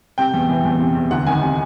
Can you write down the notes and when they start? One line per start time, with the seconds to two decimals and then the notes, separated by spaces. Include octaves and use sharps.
0.18 C3 G5
0.34 E2
0.49 E3
0.65 E2
0.80 C3
0.95 E2
1.11 D2 F#5
1.27 D#3 G#5
1.42 C3 G#5